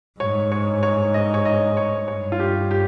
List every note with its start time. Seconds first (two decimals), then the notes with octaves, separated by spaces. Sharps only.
0.20 G#2 C#5
0.52 C#5
0.83 C#5
1.14 D#5
1.34 C#5
1.45 D#5
1.77 C#5
2.08 G2 C#5
2.32 F4
2.40 G4
2.71 G4